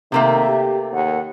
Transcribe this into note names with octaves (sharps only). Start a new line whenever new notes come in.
C3 D#3 A3 A#3 E5
G4
D#2 F#5